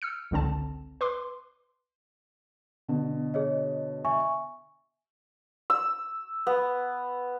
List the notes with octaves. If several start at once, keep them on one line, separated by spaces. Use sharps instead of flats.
E6 F6 C#7
G#1 C#2 D3 C4 A5
B4 C6 D6
B2 D3
G#4 C#5 D#5
E5 G#5 C#6
E6
B3